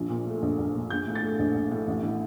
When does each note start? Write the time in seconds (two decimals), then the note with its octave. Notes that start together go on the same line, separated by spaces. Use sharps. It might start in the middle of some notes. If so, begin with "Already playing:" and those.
Already playing: A#1 F3
0.10 A#2
0.26 A3
0.42 A#1
0.58 A#1
0.75 A#2
0.90 A#1 G6
1.07 A2
1.15 A6
1.23 A3
1.39 A#1
1.55 A#1
1.71 A2
1.87 A1
2.03 A2